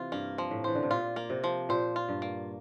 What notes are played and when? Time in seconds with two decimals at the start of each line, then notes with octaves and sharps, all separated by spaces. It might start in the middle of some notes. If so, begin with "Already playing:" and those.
Already playing: C3 E3 F4
0.12 G2 A#3
0.38 F3
0.51 A2
0.64 E3 C5
0.75 D3
0.83 C3
0.90 A#2 F4
1.16 A#3
1.30 C3
1.44 F3
1.69 A#2 C5
1.96 F4
2.09 G2
2.22 A#3